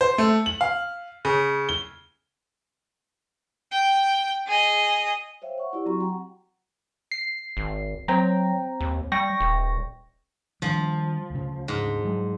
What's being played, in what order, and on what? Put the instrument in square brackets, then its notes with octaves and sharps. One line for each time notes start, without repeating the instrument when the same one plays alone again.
[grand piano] C5
A3
F#7
F5
C#3
G7
[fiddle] G5
G#4 D#5
[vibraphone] C5 C#5 E5 F5 G5
F#5 C#6
E4 F4 G4 D5
F#3 C4 F#4 A#5 C6 C#6
F#5 G5 A#5
[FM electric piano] C7
[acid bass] G#1
[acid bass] F#3 [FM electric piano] C4 G5 A#5
[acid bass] D#2
[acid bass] G3 [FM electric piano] G5 C#6 A#6
[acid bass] D#1
[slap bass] D#3 G3 D4 [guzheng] F3
[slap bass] D2 C#3
[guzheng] G#2
[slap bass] F#3 G#3